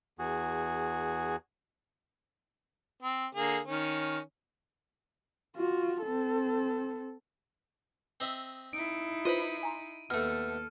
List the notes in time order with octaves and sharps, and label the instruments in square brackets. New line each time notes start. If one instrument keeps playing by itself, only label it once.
[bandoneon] E2 F#4 G#4
[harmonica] C4
D3 A#3 G#4
D#3 C#4
[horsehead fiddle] F4 F#4
C4 A4
[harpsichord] C4 D#5 E5
[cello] D#4 E4 [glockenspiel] D7
[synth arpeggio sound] F4 B4 C5 [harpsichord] D#5 B5 [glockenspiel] D#7
[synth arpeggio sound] G#5 A#5 C6
[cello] D#2 A4 [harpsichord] B2 A3 [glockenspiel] F6